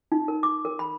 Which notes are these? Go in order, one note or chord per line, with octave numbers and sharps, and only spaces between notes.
D#4
A#4
D6
A#4
B5